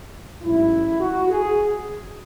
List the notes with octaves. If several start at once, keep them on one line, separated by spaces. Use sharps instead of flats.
A1 G#2 F#3 E4
F#4
G#4